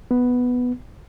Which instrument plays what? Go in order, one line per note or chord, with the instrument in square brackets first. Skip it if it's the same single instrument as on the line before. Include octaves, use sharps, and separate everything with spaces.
[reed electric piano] B3